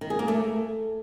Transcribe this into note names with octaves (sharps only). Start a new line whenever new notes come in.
D#3
G#4
A#3
A3